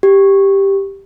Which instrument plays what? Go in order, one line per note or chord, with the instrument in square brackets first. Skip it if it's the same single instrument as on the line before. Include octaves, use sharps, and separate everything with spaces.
[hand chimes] G4